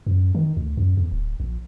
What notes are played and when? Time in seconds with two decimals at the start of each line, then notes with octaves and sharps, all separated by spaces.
0.06 F#2
0.35 D#3
0.57 D2
0.77 F#2
0.97 E2
1.12 D1
1.40 A#1